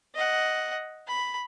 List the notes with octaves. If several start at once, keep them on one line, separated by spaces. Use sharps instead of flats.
D#5 F#5
B5